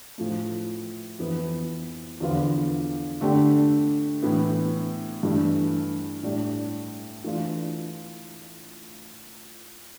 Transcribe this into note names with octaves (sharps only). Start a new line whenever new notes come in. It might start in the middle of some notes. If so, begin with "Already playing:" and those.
A2 F3 A3
F2 E3 B3
E2 D3 F3 B3 F4
D3 A3 D4 G4
A2 E3 B3
G2 E3 A3
A2 G3 D4
E3 A3 D4 F4